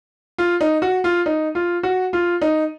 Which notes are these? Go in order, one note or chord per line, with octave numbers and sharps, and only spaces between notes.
F4
D#4
F#4
F4
D#4
F4
F#4
F4
D#4